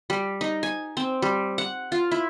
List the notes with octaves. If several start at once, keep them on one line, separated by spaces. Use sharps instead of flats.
G3
D#4
G#5
C4
G3
F#5
F4
E4